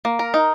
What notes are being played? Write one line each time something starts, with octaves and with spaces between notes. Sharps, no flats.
A#3
A#4
D#4